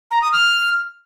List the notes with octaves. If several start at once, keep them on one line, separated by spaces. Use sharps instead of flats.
A#5
D#6
F6